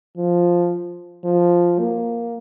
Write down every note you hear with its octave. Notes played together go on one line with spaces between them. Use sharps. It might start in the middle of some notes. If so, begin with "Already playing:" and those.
F3
F3
A#3